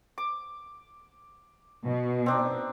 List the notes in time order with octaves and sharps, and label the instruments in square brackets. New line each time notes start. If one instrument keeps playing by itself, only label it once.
[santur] D6
[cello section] B2
[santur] C4 D4 D#4